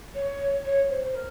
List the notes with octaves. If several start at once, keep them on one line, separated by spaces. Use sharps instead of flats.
C#5
C#5
C5
C5
A#4